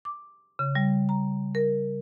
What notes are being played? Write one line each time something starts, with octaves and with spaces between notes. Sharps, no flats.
D6
C#3
G3
A#5
A#4